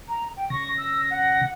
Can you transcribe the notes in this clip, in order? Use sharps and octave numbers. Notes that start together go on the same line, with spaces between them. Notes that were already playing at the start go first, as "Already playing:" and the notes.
A#5
G5
C#3 C#6 A#6
E6
F#5